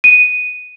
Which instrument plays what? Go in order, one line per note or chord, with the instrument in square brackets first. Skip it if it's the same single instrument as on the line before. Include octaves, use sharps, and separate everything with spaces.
[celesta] D#7